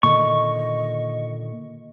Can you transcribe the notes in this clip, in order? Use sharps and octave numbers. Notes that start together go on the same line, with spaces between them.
A#2 D3 D#3 D#5 C#6